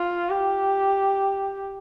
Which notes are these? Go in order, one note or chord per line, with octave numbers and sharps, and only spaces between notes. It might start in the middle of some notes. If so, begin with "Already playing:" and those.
Already playing: F4
G4